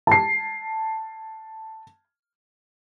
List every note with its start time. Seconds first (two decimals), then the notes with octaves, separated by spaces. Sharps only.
0.07 A5 C7